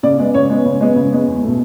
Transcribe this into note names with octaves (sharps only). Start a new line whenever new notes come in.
C#3 D5
G#3 B3
C#3 C#5
G#3 B3
C#3
G#3 B3
C#3
G#3 B3
E2
B2 A3